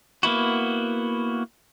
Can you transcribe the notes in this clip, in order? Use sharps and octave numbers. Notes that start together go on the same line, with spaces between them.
A#3 B3 E4 F#4